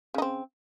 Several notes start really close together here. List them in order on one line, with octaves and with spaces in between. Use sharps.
C#3 D#4 C4